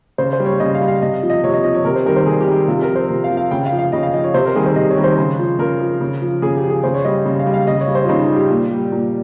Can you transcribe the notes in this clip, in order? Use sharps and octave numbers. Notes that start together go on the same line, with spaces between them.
C#3 C5
C5
G3
C#5
C#3 D#5
F5
G3
F5
C3 D#5
F3
D#5
C3 C#5
D#5
F3 D#5
C#5
C3 A#4
C5
D#3 G3 A#4
C5
C3 G#4
G4
D#3 G3
C3 F4
A#4
F3
C5
C3
F5
F3
F5
C#3 G5
F5
F3
F5
C#3 D#5
F5
F3 D#5
C#5
C3 C5
A#4
D#3 G3 G#4
C5
C3 D#5
C#5
D#3 G3
C5
C#3
F3
C#3 A#4
F3
C#3
F3
C#3 G#4
G4
F3
G#4
C#3 C5
C#5
G3 D#5
C#3
F5
G3
F5
C#3 D#5
C#5
G3
C5
F4
C#3 D#4
D#4
G3
G4
A#2
G3
A#2